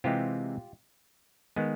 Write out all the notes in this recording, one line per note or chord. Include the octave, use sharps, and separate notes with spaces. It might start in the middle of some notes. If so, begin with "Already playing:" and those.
C3 E3 G#3 C4 F4 G4
D#3 G#3 B3